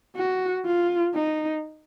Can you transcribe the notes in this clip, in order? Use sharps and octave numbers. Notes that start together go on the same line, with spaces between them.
F#4
F4
D#4